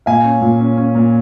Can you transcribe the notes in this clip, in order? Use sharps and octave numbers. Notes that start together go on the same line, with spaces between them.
A#2 F5 G#5
C#4
A#2
C#4
C#4
A#2